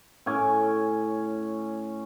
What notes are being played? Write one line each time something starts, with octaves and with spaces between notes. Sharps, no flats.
A2 C#4 G#5 D6